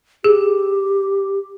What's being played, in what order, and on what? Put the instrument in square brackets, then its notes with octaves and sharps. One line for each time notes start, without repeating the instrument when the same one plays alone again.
[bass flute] G4 [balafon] G#4